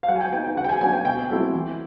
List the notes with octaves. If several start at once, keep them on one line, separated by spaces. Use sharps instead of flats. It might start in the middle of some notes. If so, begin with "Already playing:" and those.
F5
F#3 F#5
G#5
G5
B3 D#4 G5
G5
C#3 F#5
G5
G#5
F#3 B3 D4 G#5
G5
B2 G5
F#3 A3 C4 E4
E3